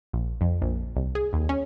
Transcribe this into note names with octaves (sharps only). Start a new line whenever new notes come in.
A#1
F2
A#1
C2
G#4
D#2
C#4